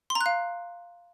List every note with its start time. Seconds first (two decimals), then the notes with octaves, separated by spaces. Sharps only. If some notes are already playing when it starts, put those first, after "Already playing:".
0.10 C6
0.15 A#5
0.21 F#6
0.26 F5